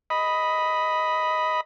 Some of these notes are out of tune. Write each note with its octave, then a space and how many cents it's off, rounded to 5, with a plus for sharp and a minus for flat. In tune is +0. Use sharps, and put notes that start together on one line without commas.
D#5 +5 B5 +0